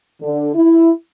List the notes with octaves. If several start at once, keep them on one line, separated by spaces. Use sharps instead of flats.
D3
E4